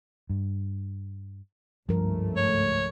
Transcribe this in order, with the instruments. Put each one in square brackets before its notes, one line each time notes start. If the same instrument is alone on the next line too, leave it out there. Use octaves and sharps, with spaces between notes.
[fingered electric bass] G2
[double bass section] G#1 C#2 A3 [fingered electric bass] G2 [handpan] F3 A#4
[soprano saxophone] C#5